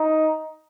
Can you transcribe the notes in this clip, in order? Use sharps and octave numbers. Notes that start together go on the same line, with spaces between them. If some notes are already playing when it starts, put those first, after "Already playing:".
Already playing: D#4